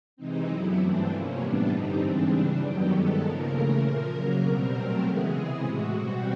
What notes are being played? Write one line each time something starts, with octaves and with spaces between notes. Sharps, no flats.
C3 E3 G#3 C4 D#4
F#2 D3 F#3 B3 E4
G2 E3 A3 C4 D4
C3 F3 A#3 C#4
A2 E3 G3 B3 D4
G2 D3 G3 C4 D#4
G#2 E3 G#3 C4 D4
C#3 E3 G3 D4
F#2 D#3 F#3 B3 G4
G2 D#3 G#3 B3 A4
C#3 F3 A#3 A#4
C#3 E3 A3
A#2 F3 A#3
F#2 C#3 F#3 A#3 A#4
B2 G3 C4 A#4
A#2 F#3 A3 C4 A#4
C#3 E3 G#3 B3 G#4
C3 E3 G#3
A2 E3 G#3 F#4
B2 G3 C4